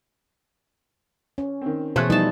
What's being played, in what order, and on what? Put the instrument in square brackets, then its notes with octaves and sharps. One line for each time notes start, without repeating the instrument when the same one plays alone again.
[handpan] C#4
[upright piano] D#3 C4
[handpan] B2 E3 [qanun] A3 G#4 [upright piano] C5 C#5 F#6
[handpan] F3 G3 E4 [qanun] D#4 A5